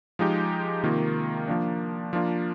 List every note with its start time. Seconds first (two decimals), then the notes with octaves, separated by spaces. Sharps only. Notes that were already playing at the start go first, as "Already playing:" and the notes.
0.19 F3 G#3 D#4 G4
0.83 C3 D#3 A#3 F4
1.48 F3 A#3 D4
2.13 F3 A#3 D4 F4